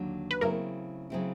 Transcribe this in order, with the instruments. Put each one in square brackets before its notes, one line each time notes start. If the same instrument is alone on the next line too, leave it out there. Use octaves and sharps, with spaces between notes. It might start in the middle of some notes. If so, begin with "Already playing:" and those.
Already playing: [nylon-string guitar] D#2 D3 F#3
[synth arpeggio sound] B4
[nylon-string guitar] C#3 F#3 A3 C4 E4 [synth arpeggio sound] A#3 A#4
[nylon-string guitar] C#3 F#3 A3 C4 E4